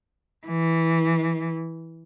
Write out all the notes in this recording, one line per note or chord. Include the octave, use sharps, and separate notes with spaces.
E3